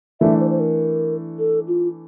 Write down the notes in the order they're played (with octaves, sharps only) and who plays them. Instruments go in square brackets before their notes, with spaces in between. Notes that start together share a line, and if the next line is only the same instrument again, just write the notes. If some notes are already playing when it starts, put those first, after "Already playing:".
[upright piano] E3 A3 D4 [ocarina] E5
[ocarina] C5
C5
A#4
A4
F4